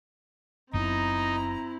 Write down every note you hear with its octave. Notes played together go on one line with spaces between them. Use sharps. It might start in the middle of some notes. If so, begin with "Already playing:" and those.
F#1 F#2 B3 C4 D#4 E4 A#5